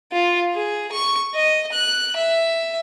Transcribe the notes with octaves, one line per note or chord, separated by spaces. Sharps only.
F4
G#4
C#6
D#5
F#6
E5